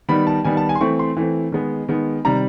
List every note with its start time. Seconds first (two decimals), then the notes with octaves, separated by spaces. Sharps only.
0.09 D#3 G3 B3 B5
0.27 A5
0.44 D#3 G3 B3 G#5
0.57 A5
0.69 G#5
0.75 C6
0.81 E3 A3 C4 C#6
0.99 C6
1.17 E3 A3 C4
1.52 D#3 G#3 B3
1.89 D#3 G#3 B3
2.25 C3 D#3 G3 A#5